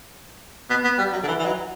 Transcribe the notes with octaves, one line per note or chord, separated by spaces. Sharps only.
B3
B3
G3
F#3
D3
E3
E3
F#3